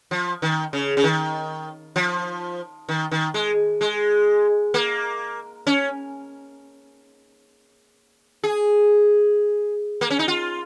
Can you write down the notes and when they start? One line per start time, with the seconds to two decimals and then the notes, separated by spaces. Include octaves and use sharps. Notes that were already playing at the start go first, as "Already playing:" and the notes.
0.11 F3
0.42 D#3
0.73 C#3
0.97 C#3
1.04 D#3
1.96 F3
2.89 D#3
3.11 D#3
3.34 G#3
3.81 G#3
4.74 A#3
5.67 C#4
8.44 G#4
10.01 A#3
10.10 C#4
10.19 D#4
10.28 F4